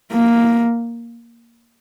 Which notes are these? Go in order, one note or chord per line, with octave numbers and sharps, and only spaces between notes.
A#3